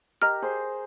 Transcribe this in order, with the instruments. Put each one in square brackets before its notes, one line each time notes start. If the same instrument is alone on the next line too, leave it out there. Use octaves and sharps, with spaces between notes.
[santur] G4 A#4 [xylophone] D#5 A#5 F6
[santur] G#4 C5